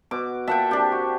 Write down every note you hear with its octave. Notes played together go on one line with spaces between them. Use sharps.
B2 D6
A#2 E5 F#5 G5 A5
C3 D4 G4
F#4